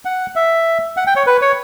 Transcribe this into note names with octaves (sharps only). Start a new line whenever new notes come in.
F#5
E5
F#5
G5
C#5
B4
C#5